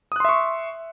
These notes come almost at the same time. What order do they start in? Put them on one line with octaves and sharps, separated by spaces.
D#6 F#6 C6 E5 C#6